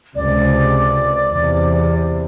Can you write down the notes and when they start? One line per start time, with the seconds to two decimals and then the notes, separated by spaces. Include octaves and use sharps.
0.16 C#2 C3 D5
1.30 E2 C3